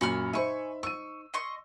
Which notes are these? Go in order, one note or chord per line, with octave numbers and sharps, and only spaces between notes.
F#2 A#2 F#3 C#5 B5 F6
D#4 C5 E5 G#5 B5 C#6
C#6 E6 D#7
D#5 C6 C#6